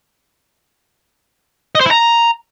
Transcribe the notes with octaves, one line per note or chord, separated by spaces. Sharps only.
D#5
C5
E4
A#5